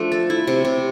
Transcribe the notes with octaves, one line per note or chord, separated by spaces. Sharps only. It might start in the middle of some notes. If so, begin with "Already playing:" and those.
Already playing: F3 A3 D4
A4
E4
C3
C3